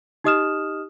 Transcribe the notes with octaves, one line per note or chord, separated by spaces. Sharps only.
D#4 G4 D#5 D#6 F6 E7